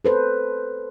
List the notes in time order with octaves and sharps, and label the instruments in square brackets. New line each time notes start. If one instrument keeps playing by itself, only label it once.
[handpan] A4 B4 C5